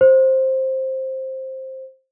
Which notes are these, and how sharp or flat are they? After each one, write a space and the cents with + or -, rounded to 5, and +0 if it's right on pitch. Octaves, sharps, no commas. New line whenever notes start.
C5 +10